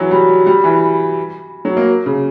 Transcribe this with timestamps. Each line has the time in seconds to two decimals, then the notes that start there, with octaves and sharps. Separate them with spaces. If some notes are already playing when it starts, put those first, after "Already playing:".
Already playing: E3 F#3
0.11 G3
0.47 G3
0.64 E3
1.65 F#3
1.77 A#3
2.06 C#3